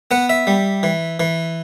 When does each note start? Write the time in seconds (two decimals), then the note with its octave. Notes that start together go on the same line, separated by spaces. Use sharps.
0.11 B3 F#5
0.30 E5
0.47 G3
0.83 E3
1.20 E3